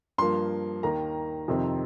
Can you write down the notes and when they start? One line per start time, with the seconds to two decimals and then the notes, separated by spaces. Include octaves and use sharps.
0.18 G2 F3 A#3 C6
0.83 D#2 D#3 A#3 A#5
1.48 F2 C3 D#3 C4